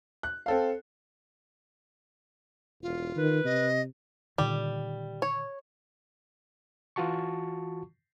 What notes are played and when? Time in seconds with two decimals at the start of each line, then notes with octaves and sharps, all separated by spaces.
0.23 F#6
0.46 C4 A4 F5
2.83 E1 F4
3.16 D#3 B4
3.45 C3 D#5
4.38 A#2 D3 D#3 G3
5.22 C#5
6.96 E3 F4 F#4 A5 C#6